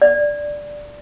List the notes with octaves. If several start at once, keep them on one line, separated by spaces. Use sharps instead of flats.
D5